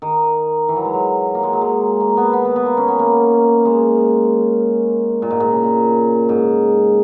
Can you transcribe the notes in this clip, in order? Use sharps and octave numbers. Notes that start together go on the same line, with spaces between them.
D#3
E3
F#3
G#3
F#3
A#3
G#3
F#3
G#3
A#3
B3
B3
B3
B3
A#3
C#4
B3
A#3
G#3
A#2
G#2
A#2
C#3
A#2
G#2